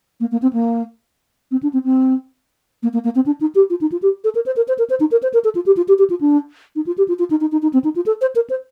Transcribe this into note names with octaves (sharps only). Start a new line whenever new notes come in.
A#3
A#3
C4
A#3
C4
D4
C4
C4
A#3
A#3
A#3
C4
D4
D#4
G4
F4
D#4
F4
G4
A4
A#4
C5
A#4
C5
A#4
C5
D#4
A#4
C5
A#4
A4
F4
G4
F4
G4
G4
F4
D4
D#4
F4
G4
F4
F4
D#4
D#4
D#4
D#4
C4
D#4
F4
A4
C5
A#4
C5